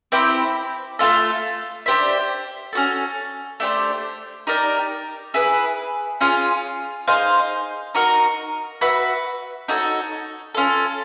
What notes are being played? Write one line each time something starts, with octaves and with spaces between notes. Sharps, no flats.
C4 E4 G4 C5
A3 C4 F4 A4
D4 G4 C5 E5
C#4 F#4 A4
A3 D4 G4 C5
D#4 G4 A#4 D5
E4 G#4 B4
C#4 F4 G#4
D#4 G#4 C5 F5
D#4 F#4 A#4
F#4 B4 E5
D#4 F#4 A4 C#5
C#4 F4 A4